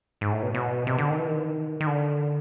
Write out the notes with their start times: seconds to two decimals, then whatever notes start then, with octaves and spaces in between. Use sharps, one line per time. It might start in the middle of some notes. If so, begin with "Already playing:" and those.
0.21 G#2
0.32 A2
0.43 B2
0.54 B2
0.87 C3
0.98 D3
1.10 D#3
1.19 E3
1.27 D#3
1.80 D#3
1.87 D3